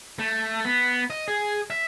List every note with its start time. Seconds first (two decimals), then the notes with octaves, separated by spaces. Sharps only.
0.19 A3
0.65 B3
1.10 D#5
1.28 G#4
1.70 E5